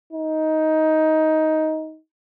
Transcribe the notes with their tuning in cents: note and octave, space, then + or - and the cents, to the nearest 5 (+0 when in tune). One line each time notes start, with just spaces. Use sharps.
D#4 +15